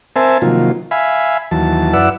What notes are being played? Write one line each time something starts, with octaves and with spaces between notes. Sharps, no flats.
C4 A#4 C5 E5 G#5 A5
C3 D#3 F3 F#3 A#3 F4
E5 F5 G#5 B5
D#2 E3 F#3 A5
F#2 E4 B4 D5 F#5 E6